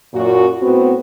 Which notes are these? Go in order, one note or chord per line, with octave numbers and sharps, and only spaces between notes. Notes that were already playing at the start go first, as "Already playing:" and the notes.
F#2 A#2 F#4
A2 B3 C4 F#4